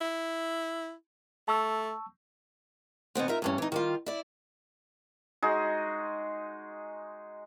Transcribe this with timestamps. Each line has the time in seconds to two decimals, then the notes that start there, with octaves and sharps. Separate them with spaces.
0.01 E4
1.48 A3 A5 C#6 E6
3.15 B2 D#3 B3 C4
3.28 D#4 F4 A#4 E5
3.42 E2 G2 C#4
3.58 E3 D#4
3.72 D#3 G3 F4
4.06 E4 D5
5.42 G#3 D#4 F#4 G#4